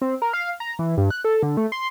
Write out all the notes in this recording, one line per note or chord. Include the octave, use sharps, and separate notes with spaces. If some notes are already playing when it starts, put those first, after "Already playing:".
C4
A#4
F5
A#5
E3
G2
F#6
A4
D3
A3
C6